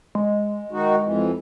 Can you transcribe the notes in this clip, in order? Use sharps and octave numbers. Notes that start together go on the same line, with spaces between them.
G#3
D#3 D#4 F#4
F2 E3